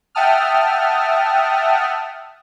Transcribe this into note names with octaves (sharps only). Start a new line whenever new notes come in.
E5 F#5 G5 A5 D#6 F6